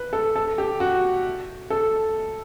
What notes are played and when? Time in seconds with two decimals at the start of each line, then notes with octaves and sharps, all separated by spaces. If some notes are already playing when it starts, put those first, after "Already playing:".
Already playing: B4
0.13 A4
0.36 A4
0.58 G4
0.80 F#4
1.70 A4